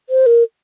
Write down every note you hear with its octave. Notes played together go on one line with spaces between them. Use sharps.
C5
A#4